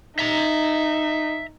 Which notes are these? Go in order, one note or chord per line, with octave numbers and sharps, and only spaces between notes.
D#4 E5 A#5